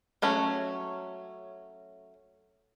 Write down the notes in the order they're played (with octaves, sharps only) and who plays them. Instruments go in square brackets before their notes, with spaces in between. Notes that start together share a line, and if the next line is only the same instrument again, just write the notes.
[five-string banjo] F#3 A3 C#4